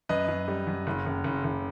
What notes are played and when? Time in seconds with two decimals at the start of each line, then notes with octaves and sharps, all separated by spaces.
0.09 F#2 B4 D#5
0.28 F#2
0.48 G3
0.67 F#2
0.87 F#1
1.06 F#1
1.24 F#1
1.44 F#1